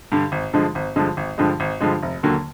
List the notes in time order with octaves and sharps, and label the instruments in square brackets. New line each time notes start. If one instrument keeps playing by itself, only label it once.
[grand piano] G2 D3
G#1
G2 D3 F3 G#3
G#1
G2 D3 F3 G#3
G#1
G2 D3 F3 G#3
G#1
G2 D3 F3 G#3
F1
D#2 D3 F#3 A#3